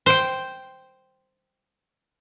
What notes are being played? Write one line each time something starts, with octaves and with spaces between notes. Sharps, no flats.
C5 G5